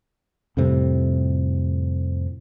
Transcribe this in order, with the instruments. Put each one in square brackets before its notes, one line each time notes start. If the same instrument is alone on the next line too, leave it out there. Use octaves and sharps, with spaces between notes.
[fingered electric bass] F2 A2 C3 G3